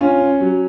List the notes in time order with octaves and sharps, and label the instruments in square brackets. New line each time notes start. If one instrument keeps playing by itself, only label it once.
[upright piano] C#4 [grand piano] F4
[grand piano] C#4
F#3